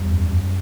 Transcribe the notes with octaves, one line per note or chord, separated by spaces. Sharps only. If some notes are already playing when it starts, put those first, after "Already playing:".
Already playing: E2 G3
F#2
F#2